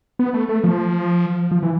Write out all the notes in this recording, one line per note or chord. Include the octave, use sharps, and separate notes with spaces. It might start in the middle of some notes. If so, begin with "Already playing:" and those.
B3
A3
A3
F3
F3
E3